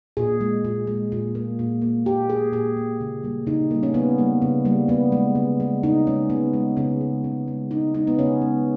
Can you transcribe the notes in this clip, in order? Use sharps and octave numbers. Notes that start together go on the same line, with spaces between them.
A#2 G#4
G#3
A#2
G#3
A#2
A#3
A#2
A#3
A#2 G4
A#3 G#4
A#2 G#4
A#3
C#3
G3 A#3
C#3 D#4
G3 A#3
C#4
C#3 B3
G3 A#3
C#3
G3 A#3
C#3 B3
G#3
C#3
G#3
C#3 D#4
G#3 C#4
C#3 B3
G#3
C#3 C#4
G#3
C#3
G#3
C#3 D#4
G#3 D#4
B3
C#3 C#4
G#3